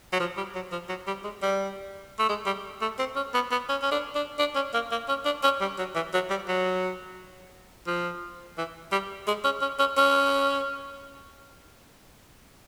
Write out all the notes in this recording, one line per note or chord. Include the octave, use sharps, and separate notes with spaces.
F#3
F3
G3
F#3
F3
F#3
G3
G#3
G3
A3
G#3
G3
A3
C4
C#4
B3
B3
C#4
C#4
D4
D4
D4
C#4
A#3
A#3
C#4
D4
C#4
G3
F#3
E3
F#3
G3
F#3
F3
E3
G3
G#3
C#4
C#4
C#4
C#4